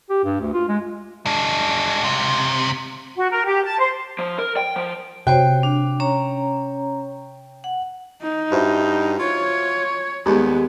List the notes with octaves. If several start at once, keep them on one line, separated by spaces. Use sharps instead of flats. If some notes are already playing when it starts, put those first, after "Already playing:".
G4
G2
D2
F4
G#3
G#3 D4
C#2 C3
F#4
A#4
G4
A5
C5
F3
A#4
G5
F3
C3 F#4 C5 C#5 G5
D4
C#4 C#5 A#5
F#5
D#4
G2 E4 F#4 C5
F4 C#5
D#2 G3 G#3 B3